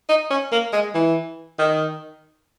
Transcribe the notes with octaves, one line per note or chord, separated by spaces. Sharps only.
D#4
C#4
A#3
G#3
E3
D#3